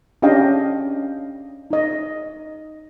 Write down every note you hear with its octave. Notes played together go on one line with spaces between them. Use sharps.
C#4 D4 G4 D#5 F5 G5
D#4 D#5